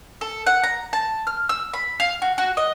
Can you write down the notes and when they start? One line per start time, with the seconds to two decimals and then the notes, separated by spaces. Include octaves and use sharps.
0.21 A4
0.47 F#5
0.64 A#5
0.93 A5
1.27 F6
1.49 E6
1.73 B5
2.00 F5
2.22 F#4
2.38 F#4
2.57 D#5